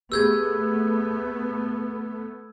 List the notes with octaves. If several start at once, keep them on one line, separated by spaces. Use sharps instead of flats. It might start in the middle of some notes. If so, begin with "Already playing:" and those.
A3 B3 G4 G#4 E6 G6 G#6